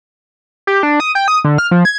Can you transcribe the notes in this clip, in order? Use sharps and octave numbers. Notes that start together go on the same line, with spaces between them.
G4
D4
D#6
G5
D#6
D3
F6
F3
G#6